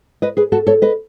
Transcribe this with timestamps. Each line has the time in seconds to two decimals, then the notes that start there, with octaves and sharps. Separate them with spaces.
0.22 B4 D#5
0.37 G#4 B4
0.52 F#4 A4
0.67 A4 C#5
0.82 B4 D#5